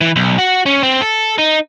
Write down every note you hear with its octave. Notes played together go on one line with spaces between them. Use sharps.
E3
B1
F#4
C#4
C4
A4
D#4